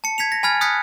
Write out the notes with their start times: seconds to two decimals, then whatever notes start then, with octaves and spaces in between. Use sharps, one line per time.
0.04 A5 C#7
0.18 G#6 B6 C#7 F7
0.32 A#6
0.43 G#5 B5 F6 G#6 A6
0.61 D#6 F#6 G#6 B6 C#7